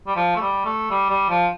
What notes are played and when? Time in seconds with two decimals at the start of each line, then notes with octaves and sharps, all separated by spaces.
0.08 G3
0.16 F3
0.36 A3
0.41 G3
0.66 A3
0.91 G3
1.10 G3
1.30 F3